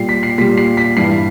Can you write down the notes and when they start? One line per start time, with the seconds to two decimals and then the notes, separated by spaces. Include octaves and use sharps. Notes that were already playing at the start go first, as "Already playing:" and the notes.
Already playing: A#2 G3 C7
0.09 B6
0.23 C7
0.38 A#2 G3 B6
0.57 C7
0.77 B6
0.97 G2 E3 G3 C7